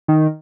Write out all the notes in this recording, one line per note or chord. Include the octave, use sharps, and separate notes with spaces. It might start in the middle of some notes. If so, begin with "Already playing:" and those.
D#3